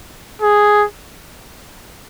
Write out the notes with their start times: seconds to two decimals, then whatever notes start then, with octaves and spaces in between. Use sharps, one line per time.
0.42 G#4